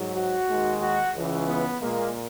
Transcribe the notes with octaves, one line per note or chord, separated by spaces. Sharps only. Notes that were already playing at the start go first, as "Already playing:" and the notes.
Already playing: G#2 F#3
F#4
D#2 D#3 G#3
F#4
C#2 C#3 E3
B3
A#2 G#3 A#3